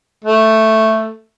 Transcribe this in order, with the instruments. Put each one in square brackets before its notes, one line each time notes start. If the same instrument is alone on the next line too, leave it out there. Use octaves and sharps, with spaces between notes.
[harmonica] A3